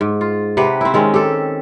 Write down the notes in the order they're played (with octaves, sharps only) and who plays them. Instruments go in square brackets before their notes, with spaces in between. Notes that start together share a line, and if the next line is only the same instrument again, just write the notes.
[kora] G#2
F4
C3 G4 B4 F#5
C4 E4
D#3 G#3 C4 C#4
G4 A4